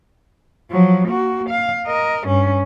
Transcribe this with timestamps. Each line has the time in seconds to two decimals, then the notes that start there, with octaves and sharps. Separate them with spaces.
0.70 F3 F#3
1.08 A#3 F#4
1.50 F5
1.87 A#4 D#5
2.27 G2 C#4